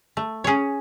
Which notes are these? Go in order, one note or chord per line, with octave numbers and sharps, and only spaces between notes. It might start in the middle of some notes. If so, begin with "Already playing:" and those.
A3
C#4 G#4 C#5